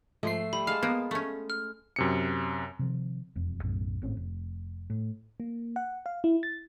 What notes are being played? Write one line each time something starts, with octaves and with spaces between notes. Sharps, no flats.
G#2 F3 A3 C7
G3 B5
G#3 F5 A5 F6
A#3 B3
A3 C#4
F6
F#2 C3 C#7
C3 D#3 F3
E1 F2
B1 F#2 A2
G#1 A2 C4 C#4
F1
A2
A#3
F#5
F5
E4
A6